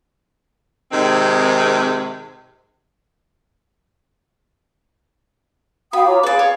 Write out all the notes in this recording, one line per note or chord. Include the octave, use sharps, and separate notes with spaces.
G#2 C3 D#3 C4
F#4 F5 G5 B5 D#6
F4 C#5 A#5 D6
G#4 B4 D5 F5
C#5